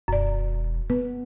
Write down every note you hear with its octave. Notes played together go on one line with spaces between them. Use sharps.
E1 F#2 D5
B3 B4